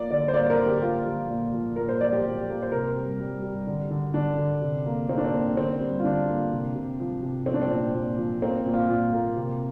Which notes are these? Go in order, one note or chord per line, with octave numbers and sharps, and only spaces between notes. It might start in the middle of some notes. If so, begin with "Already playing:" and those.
Already playing: F3 A#3 D5
D3 D5
C5
A#3 D5
A#4
D3
G4
A#3 F4
F3
A#2
F3
A#2 A#4
C5
F3 D5
G4
F3
A#3
C5
C3 A#4
G3
G3
G3
D3
D3
D3 D4
D3
C3
A#3
A#3 C4
D4
C4
A#3
D3 C4
G3
F4
D3 D4
A#3
C3
C3
F3
C3
F3 C4
D4
C4
A#2
A#2
F3
A#3 C4
A#2
F4
A#2
A#3
C3